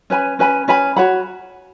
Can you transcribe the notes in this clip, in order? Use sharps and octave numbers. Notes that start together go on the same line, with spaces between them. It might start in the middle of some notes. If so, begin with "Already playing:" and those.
C#4 B4 G#5 B5
C#4 B4 G#5 B5
C#4 B4 G#5 B5
F#4 C#5 F#5 B5